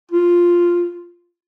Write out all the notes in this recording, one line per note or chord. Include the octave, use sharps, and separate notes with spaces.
F4